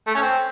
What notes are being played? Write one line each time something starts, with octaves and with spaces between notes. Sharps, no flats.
A3
C#4
C4